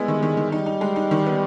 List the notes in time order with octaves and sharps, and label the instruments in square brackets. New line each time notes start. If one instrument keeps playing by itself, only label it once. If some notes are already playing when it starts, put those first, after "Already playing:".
Already playing: [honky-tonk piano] G3 B3 E4 [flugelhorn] G#3
[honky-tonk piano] D#3
D#3
D#3
[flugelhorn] G3 [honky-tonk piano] D#4
[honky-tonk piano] D#4
G#3
D#4
D#3
B3